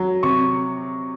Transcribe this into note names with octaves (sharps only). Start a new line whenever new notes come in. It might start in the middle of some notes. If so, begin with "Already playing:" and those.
Already playing: F#3
C3 C#6